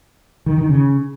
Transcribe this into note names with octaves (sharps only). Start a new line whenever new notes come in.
D#3
D#3
C#3